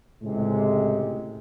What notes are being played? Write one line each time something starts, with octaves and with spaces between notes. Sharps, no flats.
C#2 A2 C3 G#3